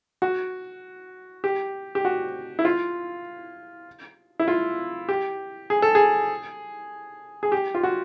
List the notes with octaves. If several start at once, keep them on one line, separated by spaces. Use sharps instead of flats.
F#4
G4
G4
F#4
E4
F4
E4
F4
G4
G#4
A4
G#4
G#4
G4
F4
F#4